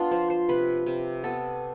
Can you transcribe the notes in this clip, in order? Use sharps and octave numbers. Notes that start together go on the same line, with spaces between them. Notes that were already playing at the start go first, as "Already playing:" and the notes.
Already playing: B3 D4 F4
F3 C5
C5
C3 B4
C3
B3 A4